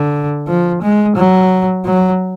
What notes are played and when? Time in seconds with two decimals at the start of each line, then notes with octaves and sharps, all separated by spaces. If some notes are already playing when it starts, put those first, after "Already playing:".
Already playing: D3
0.48 F3
0.82 G#3
1.16 F#3
1.85 F#3